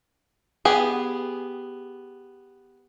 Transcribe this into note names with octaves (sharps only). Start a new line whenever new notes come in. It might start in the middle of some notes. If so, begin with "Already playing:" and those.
B3 G4 G#4